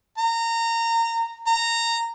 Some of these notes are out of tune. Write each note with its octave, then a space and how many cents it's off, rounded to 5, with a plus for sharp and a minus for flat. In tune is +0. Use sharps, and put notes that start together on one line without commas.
A#5 -20
A#5 -15